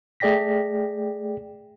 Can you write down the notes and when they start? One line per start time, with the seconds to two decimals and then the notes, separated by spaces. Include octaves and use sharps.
0.20 A3 G#4 D5 G5 A#6 B6